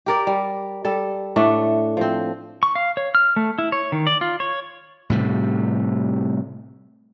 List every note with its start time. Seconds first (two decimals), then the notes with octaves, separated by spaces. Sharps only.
0.06 G4 A#4 D5
0.27 G3
0.85 G3 A4
1.36 A2 A3 D4 F#5
1.97 F3 C4
2.63 C#6
2.76 F5
2.97 C#5
3.15 F6
3.36 A3
3.59 E4
3.72 C#5
3.92 D#3
4.07 D5
4.21 F4
4.40 C#5
5.10 A2 C3 G3